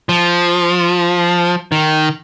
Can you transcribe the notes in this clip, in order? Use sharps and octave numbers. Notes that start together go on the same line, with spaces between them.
F3
D#3